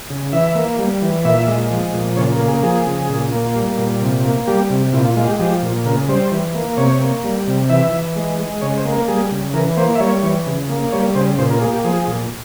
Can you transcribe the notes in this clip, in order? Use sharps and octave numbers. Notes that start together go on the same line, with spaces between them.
C#3
E3 E5
A#3
G3
E3
A#2 E5
G#3
F3
A#2
C#3 C#5
A#4
A#3
G#4
F3 G#4
C#3
A#2
A#3
G3
A#2
C3
A#3
G3 G4
C3
A#2 E4
F4
G#3 F4
G4
F3 G4
A#2
C#3 A#4
G3 C5
E3
A#3
C3 C#5
A#3
G3
C3
E3 E5
E3
G#3
G#3
C#3 C#5
C5
A#3
A#4
G3 G#4
C#3
E3 A#4
A#3 C5
E5
G3 C#5
E3
C#3
A#3
G3 C#5
C#3 C5
A#2 C5
A#4
A#3 G#4
G4
F3 G#4
A#2